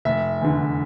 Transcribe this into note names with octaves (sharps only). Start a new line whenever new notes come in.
F1 E5
E2 D3